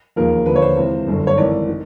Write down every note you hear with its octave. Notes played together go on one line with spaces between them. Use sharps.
E1 D#2 C#3 F3 A#4
D#2 D3 F3 B4
C#5
C5
C#2 C3 E3
G1 F#2 D3
C#5
G#1 G#2 E3 D5
D#3